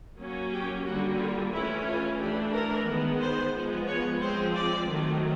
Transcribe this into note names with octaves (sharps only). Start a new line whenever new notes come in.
F#3 A#3 C#4
G4
D3 G3 A#3 F#4
F4
E3 A3 C#4 E4
F4
E3 A3 D4 G4
A#4
D#3 G#3 B3
C5
F3 G#3 B3
C#5
F3 G#3 C4 C5
D5
D#3 F#3 A3 C4